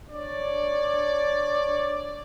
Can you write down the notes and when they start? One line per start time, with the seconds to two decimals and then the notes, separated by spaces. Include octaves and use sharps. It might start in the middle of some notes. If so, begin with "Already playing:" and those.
0.11 D4 C#5 D5